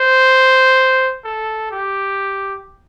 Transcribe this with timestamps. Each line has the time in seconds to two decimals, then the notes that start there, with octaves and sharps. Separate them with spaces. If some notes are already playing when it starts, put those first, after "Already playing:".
Already playing: C5
1.25 A4
1.71 G4